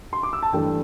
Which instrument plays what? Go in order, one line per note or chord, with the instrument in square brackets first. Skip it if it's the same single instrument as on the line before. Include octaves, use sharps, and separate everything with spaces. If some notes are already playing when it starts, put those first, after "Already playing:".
[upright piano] C6
D6
E6
A5
G2 E3 A3 G5